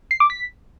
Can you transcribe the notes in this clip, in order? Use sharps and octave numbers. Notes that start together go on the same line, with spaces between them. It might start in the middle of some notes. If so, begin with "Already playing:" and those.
C7
D6
B6